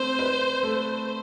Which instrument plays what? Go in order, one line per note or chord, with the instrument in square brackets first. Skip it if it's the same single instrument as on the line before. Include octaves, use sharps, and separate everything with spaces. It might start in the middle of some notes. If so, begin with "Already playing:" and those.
Already playing: [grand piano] A3 C4 [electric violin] C5
[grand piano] B4
A3